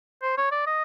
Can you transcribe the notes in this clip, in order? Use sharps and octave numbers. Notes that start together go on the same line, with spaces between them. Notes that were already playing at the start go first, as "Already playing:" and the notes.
C5
C#5
D5
D#5